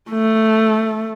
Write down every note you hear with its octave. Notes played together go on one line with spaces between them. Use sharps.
A3